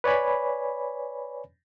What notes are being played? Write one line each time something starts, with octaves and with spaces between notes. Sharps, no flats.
B4 C#5 D5 G#5 B5